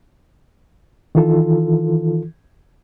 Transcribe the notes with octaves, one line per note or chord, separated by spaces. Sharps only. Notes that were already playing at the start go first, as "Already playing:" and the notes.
D#3 E3 F4 A4